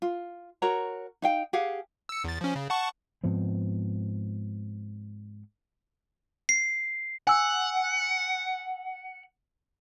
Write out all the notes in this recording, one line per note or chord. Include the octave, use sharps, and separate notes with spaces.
F4
F#4 A#4 C#5 A#5
D#4 F5 G5
G4 G#4 F5 F#5
E6 C#7
E2 A6
F3 C#4
C#3
F#5 A5 C#6
G#2 F3 B3 C4
C7
F#5 G#5 E6